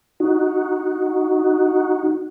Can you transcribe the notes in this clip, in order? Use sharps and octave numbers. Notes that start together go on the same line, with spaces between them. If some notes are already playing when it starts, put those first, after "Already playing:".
D#4 F#4